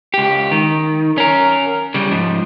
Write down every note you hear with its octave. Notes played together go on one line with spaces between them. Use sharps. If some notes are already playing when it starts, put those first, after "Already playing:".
C#2 G4
D#3
C#4 A#4
C#3 G3
G#2 F3